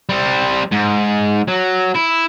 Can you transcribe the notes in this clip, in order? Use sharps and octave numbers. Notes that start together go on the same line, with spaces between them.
G3 C4
G#2
F#3
E4